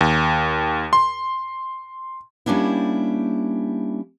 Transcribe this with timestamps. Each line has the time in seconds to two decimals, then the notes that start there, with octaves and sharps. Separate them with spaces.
0.01 D#2
0.93 C6
2.46 G3 A#3 C#4 D4 E4